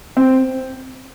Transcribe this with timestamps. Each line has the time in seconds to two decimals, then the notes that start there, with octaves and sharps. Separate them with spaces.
0.17 C4